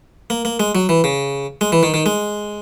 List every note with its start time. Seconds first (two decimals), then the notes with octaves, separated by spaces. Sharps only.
0.30 A#3
0.45 A#3
0.60 G#3
0.75 F#3
0.89 E3
1.04 C#3
1.61 G#3
1.72 E3
1.83 D#3
1.94 D#3
2.06 G#3